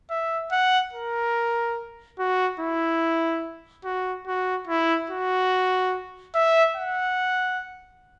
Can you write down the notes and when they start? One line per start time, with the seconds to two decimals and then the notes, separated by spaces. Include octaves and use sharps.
0.10 E5
0.52 F#5
0.93 A#4
2.19 F#4
2.60 E4
3.85 F#4
4.27 F#4
4.67 E4
5.10 F#4
6.35 E5
6.76 F#5